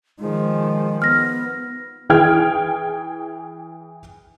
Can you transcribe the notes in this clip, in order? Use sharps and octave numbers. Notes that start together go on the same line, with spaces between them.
D#3 F3 G#3
B3 F6 A#6
E3 G#4 G5 F6 G#6